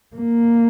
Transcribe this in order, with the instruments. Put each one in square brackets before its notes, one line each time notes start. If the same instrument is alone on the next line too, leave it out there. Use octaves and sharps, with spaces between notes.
[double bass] A#3